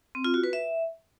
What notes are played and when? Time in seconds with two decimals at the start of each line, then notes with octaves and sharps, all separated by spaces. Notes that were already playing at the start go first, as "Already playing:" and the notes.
0.15 C4
0.24 F4
0.34 F#4
0.44 B4
0.53 E5